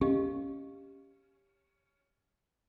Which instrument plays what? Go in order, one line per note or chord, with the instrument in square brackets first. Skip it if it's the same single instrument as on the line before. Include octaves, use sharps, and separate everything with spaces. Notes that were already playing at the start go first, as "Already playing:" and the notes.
[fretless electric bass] C#4 [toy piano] G4 D#5 F5